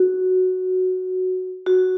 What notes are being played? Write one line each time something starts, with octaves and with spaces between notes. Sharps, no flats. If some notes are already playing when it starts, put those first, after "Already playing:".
Already playing: F#4
F#4